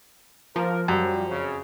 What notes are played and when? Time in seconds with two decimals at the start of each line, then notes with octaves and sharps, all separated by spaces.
0.56 F3 A#3 A#4
0.88 F#2 G3
1.29 F2 C#3